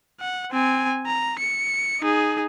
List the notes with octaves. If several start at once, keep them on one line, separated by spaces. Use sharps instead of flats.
F#5
C4 G#5
A#5
C#7
D#4 G#4